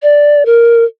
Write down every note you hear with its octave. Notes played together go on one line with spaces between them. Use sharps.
D5
A#4